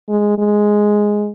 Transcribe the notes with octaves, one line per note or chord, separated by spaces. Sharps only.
G#3
G#3